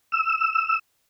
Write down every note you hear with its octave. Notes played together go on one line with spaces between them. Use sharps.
E6